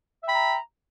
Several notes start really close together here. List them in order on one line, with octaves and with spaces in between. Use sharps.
E5 G5 B5 A#5